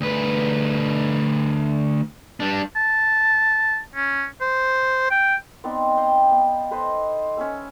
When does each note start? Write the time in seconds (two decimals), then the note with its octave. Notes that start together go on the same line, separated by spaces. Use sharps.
0.01 D2 B4
2.40 G3 D4
2.76 A5
3.95 C#4
4.41 C5
5.11 G5
5.64 B3 C4 D#4 D5
5.97 F5 G5 A#5
6.31 B3
6.71 A4 B4 C5 D#5
7.37 C#4 E5 G#5 E6